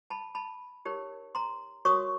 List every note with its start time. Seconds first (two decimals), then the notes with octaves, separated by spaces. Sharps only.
0.10 A5 B5
0.35 A5 B5
0.85 D#4 G4 A#4 C#5
1.35 A#5 C6
1.85 F#4 A#4 C#5 C#6 D#6